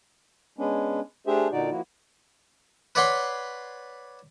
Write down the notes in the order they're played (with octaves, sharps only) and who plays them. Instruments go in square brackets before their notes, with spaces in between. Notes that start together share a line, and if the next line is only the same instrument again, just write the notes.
[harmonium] G#3 B3 C#4 D4
A3 D4 G4 G#4 C5 E5
A#2 D3 D#4 F#4 D5
F3 A#3 E4 F#4
[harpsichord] B4 C#5 D5 F#5 B5 C6